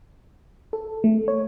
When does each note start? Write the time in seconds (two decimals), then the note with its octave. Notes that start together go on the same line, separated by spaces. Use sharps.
0.73 A4
1.04 A3
1.28 C#5